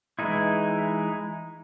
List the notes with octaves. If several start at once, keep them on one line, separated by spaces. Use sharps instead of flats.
E3 G#3 D#4 E4